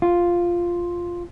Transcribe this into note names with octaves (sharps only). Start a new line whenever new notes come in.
F4